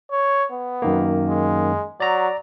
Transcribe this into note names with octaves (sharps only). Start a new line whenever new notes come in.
C#5
B3
F#2 D#3 A#3
G#3
F#3 D5 A#5